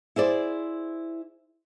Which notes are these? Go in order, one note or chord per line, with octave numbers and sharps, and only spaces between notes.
E4 G#4 C5 D5